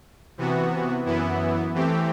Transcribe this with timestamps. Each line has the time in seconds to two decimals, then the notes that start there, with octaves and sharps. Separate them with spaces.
0.38 C3 E3 B3 F#4
1.05 F#2 E3 B3 E4
1.74 E3 A3 C4 G4